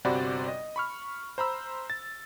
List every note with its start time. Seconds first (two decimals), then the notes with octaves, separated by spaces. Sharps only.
0.05 G1 C3 F#4 C5 D5 B5
0.48 D#5
0.76 B5 C#6 F6
1.38 C5 A#5 B5 E6
1.90 A6